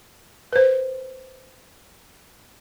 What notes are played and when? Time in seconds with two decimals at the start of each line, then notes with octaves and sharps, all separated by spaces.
0.53 B4 C5